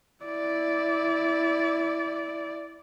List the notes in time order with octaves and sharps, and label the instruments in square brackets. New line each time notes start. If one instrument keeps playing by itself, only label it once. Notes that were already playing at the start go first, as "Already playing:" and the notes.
[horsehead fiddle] E4 D5